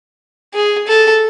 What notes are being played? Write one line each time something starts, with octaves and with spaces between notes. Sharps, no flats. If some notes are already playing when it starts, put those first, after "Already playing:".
G#4
A4